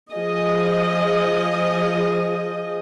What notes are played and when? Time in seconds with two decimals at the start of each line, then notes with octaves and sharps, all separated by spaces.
0.12 F3 G#4 D#5